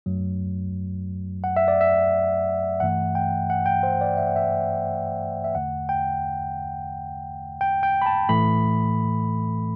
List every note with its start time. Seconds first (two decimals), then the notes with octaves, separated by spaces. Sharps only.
0.06 F#2 F#3 A3
1.44 F#5
1.57 E5
1.68 D5
1.81 E5
2.80 G2 E3 A3 F#5
3.15 G5
3.50 F#5
3.66 G5
3.83 C5
4.01 D5
4.17 E5
4.27 F#5
4.36 E5
5.44 E5
5.55 E2 D3 A3 F#5
5.89 G5
7.61 G5
7.83 G5
8.02 B5
8.06 A5
8.29 A2 E3 A3 B5